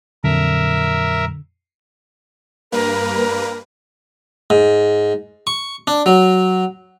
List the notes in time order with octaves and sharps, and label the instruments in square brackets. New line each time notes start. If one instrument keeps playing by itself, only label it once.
[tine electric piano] F2 A#2 F#3 [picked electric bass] D3 [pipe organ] A#4 E5
[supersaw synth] G2 A#3 B4 [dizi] A#4
[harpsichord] G#2
C#6
D4
F#3